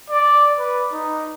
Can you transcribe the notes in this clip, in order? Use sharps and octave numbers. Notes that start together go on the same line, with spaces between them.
D5
B4
D#4